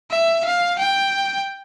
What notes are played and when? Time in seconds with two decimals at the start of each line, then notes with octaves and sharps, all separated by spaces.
0.11 E5
0.45 F5
0.79 G5